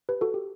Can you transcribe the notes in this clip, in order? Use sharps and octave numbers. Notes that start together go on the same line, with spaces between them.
G4 B4
F#4 A4
G4